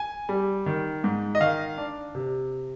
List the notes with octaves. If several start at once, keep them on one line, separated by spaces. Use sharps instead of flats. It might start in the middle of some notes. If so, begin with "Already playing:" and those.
Already playing: G#5
G3
D#3
G#2
D#5
D#3 F5
D4
C3